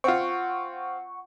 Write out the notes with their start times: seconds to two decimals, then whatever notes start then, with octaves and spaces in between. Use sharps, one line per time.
0.04 C4 F4 F#5 C#6